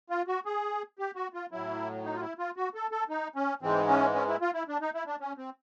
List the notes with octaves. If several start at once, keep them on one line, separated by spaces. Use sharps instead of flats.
F4
F#4
G#4
G4
F#4
F4
A2 F#3 E4
D#4
F4
E4
F4
F#4
A4
A4
D#4
C#4
G#2 E3 G#3 C4
C#4
C#4
E4
F4
E4
D4
D#4
E4
D4
C#4
C4